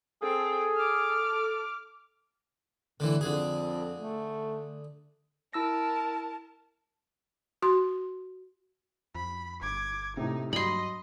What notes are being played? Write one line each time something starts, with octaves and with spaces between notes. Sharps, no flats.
C4 G#4 A4 G5
D6 F6
A2 D3 E3
F2 D3 G#4
A3
E4 A#4 A5 E6 A#6
F#4 C6
F2 B5
G1 D6 G#6
A2 C3 D#4
G2 F#3 D#5 B5 C6